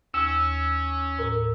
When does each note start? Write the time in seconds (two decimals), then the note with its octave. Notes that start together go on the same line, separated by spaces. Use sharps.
0.14 D#2 C#4 E6
1.18 A2 A#4